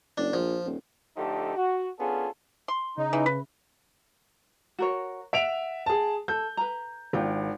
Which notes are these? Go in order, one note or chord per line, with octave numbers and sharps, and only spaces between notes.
F#1 D4
A#1 F3
D#1
D3 F3 A3 D#4 G4 A4
F#4
B3 C#4 D4 F4 G#4 A4
C6
C#3 D#4
C#3 E3
B4
F#4 A#4 C#5
E5 F#5 D7 F7
G#4 A5
A4 G6
B4 A#5
G#1 D4 F4 G5